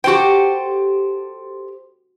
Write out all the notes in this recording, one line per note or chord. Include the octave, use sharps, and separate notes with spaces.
F#4 G4 A4 C5 G5